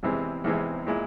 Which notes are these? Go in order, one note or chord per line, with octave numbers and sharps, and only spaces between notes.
E2 C3 E3 G#3 C4
E2 C3 E3 G#3 C4
A#2 G#3 E4